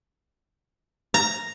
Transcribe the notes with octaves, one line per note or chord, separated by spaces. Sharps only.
A#5